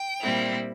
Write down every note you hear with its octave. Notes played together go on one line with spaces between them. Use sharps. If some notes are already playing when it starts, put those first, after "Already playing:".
Already playing: G5
A#2 G3 C4 E4